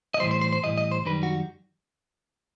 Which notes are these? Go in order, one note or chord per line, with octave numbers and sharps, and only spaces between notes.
D#5
A2 E3 G3 C5
C5
C5
C5
A2 E3 G3 D#5
D#5
C5
F#2 D#3 G3 B4
F#4